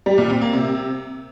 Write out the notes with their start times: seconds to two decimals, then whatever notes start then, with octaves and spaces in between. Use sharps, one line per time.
0.06 G3
0.18 A#2
0.30 C4
0.41 A#3
0.53 C3